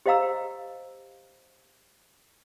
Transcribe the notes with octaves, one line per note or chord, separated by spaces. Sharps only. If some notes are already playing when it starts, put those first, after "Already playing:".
G4 C5 D#5 F5 A#5 E6